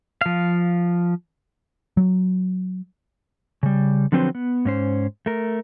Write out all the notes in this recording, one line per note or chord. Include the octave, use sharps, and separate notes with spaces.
F3 F5
F#3
C#3 G3
D3 F3 F#3 C4 B4 C5
B3
G#2 C#4 C5
A3 A#4